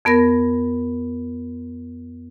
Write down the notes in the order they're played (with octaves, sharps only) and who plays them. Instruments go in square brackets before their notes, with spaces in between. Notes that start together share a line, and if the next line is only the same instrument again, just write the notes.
[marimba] F2 B3 A#4 A#6